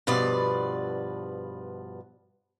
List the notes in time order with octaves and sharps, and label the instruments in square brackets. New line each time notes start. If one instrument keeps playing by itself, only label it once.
[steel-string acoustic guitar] G2 B2 F3 B4 D5